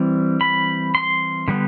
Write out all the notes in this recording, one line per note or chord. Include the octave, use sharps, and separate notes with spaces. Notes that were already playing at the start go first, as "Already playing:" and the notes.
Already playing: E3 G3 C4
B5
C6
D3 G3 B3